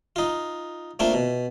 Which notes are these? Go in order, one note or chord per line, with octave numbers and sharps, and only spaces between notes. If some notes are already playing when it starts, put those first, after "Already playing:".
D#4 F4
A3 A#3 C4 D4 F4
B2